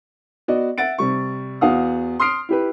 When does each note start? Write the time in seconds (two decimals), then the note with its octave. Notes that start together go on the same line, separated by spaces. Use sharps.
0.48 B3 F#4 D5 D#5
0.78 E5 F#5 A6 D7
0.98 C3 G3 C#6
1.61 E2 F#4 F5 F#5 D#6
2.19 C6 D#6 F6 C7 D7
2.49 E4 G4 B4